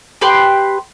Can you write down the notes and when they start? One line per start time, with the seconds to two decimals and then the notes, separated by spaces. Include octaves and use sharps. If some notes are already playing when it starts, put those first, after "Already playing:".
0.21 G4 B4 G5 C6